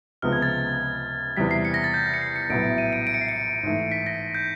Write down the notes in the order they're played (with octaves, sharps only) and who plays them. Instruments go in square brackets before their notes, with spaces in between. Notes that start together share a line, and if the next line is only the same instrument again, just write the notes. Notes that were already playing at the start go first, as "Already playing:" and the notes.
[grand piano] C#2 C3 F3 G#3 B3 [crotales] F6
[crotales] G#6
A6
[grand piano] E2 C3 E3 G3 [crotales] B6
[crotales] C7
C#7
A#6
A6
G6
C#7
C7
C#7
[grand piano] A#1 A2 F#3 B3 E4 [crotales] D7
[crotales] D#7
D7
D7
C#7
C7
C#7
[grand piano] G#2 E3 A3
[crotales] B6
A#6
G6